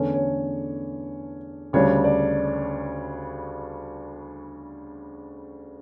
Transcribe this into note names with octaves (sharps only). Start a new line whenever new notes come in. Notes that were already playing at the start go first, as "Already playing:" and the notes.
Already playing: E2 D3 A3 C#4 C#5
C#5
D2 C#3 G3 D4 C#5
D5